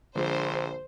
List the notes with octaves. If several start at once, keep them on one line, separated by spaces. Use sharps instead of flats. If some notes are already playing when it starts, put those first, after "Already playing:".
A#1 D3 F3 G#3 C5